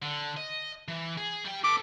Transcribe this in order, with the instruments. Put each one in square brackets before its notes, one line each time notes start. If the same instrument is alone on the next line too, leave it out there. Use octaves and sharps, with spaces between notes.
[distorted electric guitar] D3
D#5
E3
G#4
G3 G5
[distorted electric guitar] A4 B4 [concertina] D6